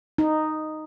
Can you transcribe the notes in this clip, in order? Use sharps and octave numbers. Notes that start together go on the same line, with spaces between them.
D#4